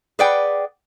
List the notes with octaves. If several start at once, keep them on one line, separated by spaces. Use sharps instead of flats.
G#4 B4 D5 F#5 G5